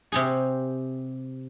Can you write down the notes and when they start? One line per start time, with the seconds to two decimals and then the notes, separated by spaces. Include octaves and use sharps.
0.12 C3 G4 G#4